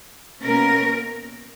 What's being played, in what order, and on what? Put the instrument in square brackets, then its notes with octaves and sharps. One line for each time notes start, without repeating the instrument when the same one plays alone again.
[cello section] B2 A#3 C#4 A#4